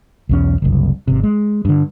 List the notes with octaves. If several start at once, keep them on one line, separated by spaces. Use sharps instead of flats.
B1 E2 C#4
F#1 C2
G#1 C3
G#3
G2 D3